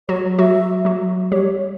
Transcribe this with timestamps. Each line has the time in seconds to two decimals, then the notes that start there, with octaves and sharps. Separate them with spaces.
0.09 F#3 F#4 C#5
0.39 F#3 F#4 E5
0.85 F#3 F#4
1.31 G3 G4 C#5